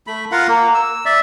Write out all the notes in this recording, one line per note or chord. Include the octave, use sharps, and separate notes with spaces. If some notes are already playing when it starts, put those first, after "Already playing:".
A3 B5
F4 A#4 F5 F#5
A#3
E6
D5 E5